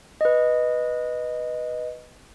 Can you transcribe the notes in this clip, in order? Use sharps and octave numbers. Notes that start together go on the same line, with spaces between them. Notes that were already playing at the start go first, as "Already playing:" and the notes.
B4 D#5